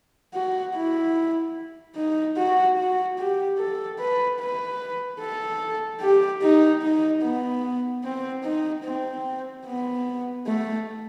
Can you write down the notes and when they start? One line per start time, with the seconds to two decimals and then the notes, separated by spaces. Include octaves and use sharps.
0.34 F#4
0.75 E4
1.96 D#4
2.37 F#4
2.78 F#4
3.18 G4
3.59 A4
3.99 B4
4.40 B4
5.20 A4
6.01 G4
6.42 D#4
6.83 D#4
7.22 B3
8.04 C4
8.44 D#4
8.84 C4
9.66 B3
10.47 A3